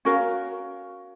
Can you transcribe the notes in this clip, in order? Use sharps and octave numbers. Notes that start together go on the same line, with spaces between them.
C#4 F#4 A#4 F5